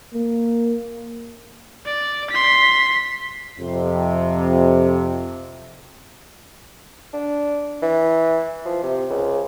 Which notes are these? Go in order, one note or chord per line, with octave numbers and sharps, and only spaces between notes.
A#3
D5
C6 B6
F2 C3
D4
E3
F3
C3
C#2